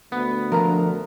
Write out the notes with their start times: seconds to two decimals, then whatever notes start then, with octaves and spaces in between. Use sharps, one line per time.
0.12 D2 B3
0.52 F3 D4 A#4 A#5